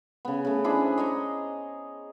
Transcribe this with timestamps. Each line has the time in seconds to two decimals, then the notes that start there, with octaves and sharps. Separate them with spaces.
0.25 C#3 B3
0.45 C#3 A3
0.64 D4 E4 G#4 C5
0.98 D#5 G#5 A#5 C#6